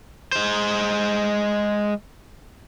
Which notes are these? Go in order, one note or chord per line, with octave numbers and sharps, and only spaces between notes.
G#3 C5